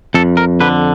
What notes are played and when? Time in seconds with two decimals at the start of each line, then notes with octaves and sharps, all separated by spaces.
0.14 F2 A4
0.37 A#4
0.60 D3 B4